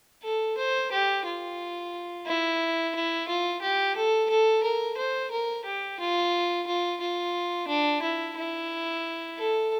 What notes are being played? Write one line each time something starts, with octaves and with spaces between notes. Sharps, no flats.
A4
C5
G4
F4
E4
E4
F4
G4
A4
A4
A#4
C5
A#4
G4
F4
F4
F4
D4
E4
E4
A4